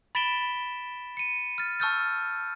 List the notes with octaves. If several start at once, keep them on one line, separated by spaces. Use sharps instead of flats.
B5 A6 B6 D7 E7 G7
C#7 D#7
F6 A6
A5 C#6 E6 F6 G6 A6